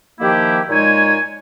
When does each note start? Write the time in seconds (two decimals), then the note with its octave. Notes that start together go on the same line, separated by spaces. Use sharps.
0.19 D#3 F3 A#3 E4 G4
0.69 A#2 G#3 D#4 C#5 G#5